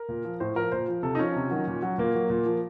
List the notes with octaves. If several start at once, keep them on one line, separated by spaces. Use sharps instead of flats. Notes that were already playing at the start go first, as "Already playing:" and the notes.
Already playing: A#4
A#2
F3
A2 C5
F3 A#4
A#2 C5
F3
C3 A4
D#4
F3 C#4
C3
D#3 F#3
A#2
F#3
A#2 A#3
F#3
A#2
F3